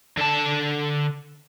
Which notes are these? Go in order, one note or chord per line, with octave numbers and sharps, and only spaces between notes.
D3 A5